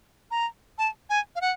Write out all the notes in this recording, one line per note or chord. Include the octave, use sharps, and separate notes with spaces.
A#5
A5
G#5
F5
F#5